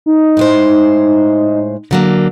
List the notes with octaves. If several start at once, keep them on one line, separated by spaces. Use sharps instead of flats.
D#4
A2 G#3 C5
D3 F#3 A#3